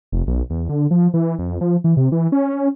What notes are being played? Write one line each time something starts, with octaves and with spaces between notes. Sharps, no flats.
F1
B1
E2
D3
F3
E3
F2
F3
E3
C3
E3
C#4